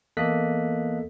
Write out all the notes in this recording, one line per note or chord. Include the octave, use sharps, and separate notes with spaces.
E2 A#3 A4 D#5 F#6 B6